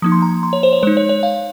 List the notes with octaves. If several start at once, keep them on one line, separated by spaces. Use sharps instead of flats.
F3 A#3 D#4 D#6
C6
A#5
C6
C#5
C5
C#5
G#3 D#4 C5
C#5
C#5
F5